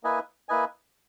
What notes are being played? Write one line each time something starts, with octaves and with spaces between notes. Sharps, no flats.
A#3 E4 B4 D#5 G#5
A#3 E4 B4 D#5 G#5